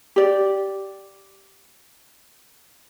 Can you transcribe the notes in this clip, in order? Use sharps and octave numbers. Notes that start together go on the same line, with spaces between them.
G4 D5